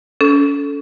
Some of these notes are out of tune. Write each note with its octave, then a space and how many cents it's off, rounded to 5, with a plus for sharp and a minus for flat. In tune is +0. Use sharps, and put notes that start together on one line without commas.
C#4 +35 A4 -10